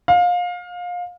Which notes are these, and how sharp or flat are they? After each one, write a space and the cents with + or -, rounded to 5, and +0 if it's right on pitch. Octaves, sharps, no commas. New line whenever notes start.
F5 +25